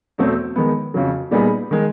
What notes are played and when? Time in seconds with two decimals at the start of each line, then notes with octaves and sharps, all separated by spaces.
0.18 E2 B2 F#3 A3 C4
0.56 D#3 G#3 B3
0.94 F2 C#3 F#3
1.31 A#2 G3 B3 D#4 G#4
1.71 D#3 G#3